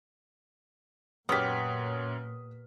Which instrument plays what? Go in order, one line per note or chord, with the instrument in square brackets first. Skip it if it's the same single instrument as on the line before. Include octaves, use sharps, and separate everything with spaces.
[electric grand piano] F#2 C#5 [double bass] A#2 [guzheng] B3 G4 [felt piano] D#6 F6 B6